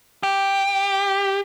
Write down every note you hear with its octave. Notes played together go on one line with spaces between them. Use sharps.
G4